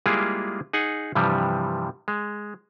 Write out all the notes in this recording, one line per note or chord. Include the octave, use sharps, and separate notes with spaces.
G3 G#3 A#3 E4 F4 G#4
D#4 G#4 F#5 G#5
G2 C3 E3 F3 G3
G#3